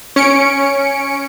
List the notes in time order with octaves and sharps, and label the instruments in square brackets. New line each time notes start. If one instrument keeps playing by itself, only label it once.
[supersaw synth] C#4 C#7 D7